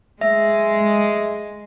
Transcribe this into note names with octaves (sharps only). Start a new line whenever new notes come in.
G#3 E5